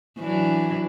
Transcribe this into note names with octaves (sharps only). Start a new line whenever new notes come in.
E3 F#3 D4